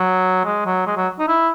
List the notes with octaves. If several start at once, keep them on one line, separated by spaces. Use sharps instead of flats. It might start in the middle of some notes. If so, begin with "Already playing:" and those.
Already playing: F#3
G#3
F#3
G#3
F#3
D#4
E4